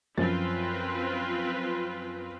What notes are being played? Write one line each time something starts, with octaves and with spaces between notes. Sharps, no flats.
F#2 F3 C4 F4 B4 A6